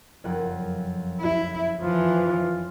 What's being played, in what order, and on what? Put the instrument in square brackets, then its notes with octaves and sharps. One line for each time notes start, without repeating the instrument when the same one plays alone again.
[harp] F#1 F2 F#5
[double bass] E4
[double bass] E3 F3 [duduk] F4